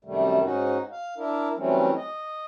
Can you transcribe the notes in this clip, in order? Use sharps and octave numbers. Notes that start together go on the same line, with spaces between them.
F#2 C3 D#3 G3 A3
G#2 C#4 D#4 F#4
F5
D4 E4 A#4
E3 F#3 G3 A3 C4 C#4
D#5